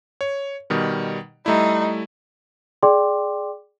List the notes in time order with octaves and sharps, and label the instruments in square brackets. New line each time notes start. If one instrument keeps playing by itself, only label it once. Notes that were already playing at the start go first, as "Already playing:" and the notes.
[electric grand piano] C#5
B2 D#3 G3
[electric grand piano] G3 A3 E4 [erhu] D#4
[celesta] G#4 D5 G5 C6 D6